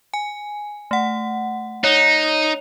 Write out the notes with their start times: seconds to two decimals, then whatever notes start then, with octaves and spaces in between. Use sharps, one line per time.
0.14 G#5
0.91 A3 F#5
1.84 D#4 C#5